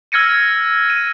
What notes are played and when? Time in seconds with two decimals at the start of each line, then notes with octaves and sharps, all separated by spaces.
0.12 E6 F6 G#6 A#6 C#7 D#7
0.90 D#7